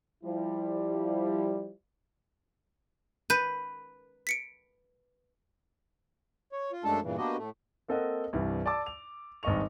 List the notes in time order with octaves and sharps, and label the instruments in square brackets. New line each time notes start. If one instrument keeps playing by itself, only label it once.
[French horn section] F3 G3 E4
[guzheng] B4 [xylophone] G6 D#7
[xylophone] B6 C#7 D7
[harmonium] C#5
F4
F#2 G#3 A3 D4 A4 A5
G2 A#2 C#3 E3
A#3 B3 D4 F#4 G4 D#5
A2 A3
[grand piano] A#3 C4 A4 A#4 D#5 F#5
C2 G2 E3
D5 A5 D6 E6
F7
G#1 G2 D#3 D#5 C#6 F7